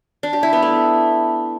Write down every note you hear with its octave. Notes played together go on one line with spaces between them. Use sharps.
D4
G4
E4
B3
A3